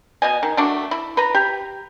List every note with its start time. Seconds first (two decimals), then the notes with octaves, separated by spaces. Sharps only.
0.22 B2 D#5 G#5
0.43 D#3
0.57 A3 D4 F#4
0.91 E4
1.17 B4 A#5
1.35 G4